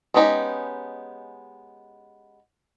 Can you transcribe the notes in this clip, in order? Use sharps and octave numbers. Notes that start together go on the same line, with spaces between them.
G#3 B3 C#4 D#4 G4